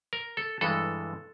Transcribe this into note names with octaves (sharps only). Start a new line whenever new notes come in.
A#4
A4
G2 E3 G#3 A4